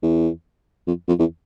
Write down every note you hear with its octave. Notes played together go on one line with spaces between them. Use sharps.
E2
F2
F2
E2